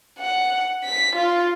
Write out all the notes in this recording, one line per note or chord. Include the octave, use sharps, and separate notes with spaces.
F#5
B6
F4